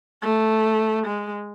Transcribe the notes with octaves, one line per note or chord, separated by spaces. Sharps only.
A3
G#3